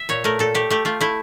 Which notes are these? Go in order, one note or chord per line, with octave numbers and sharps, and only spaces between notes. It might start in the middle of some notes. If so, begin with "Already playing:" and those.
Already playing: E5
A#2 C#5
A3 A#4
A#2 A4
A3 G4
A3 G4
A3 F4
A3 E4